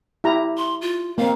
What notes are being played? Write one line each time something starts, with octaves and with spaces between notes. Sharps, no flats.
E4 G4 A#5
C6
F4
A#3 C4 F5